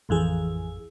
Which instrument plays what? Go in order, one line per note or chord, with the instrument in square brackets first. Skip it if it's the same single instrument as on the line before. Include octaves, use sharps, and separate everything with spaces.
[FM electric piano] A1 F2 E3 G#4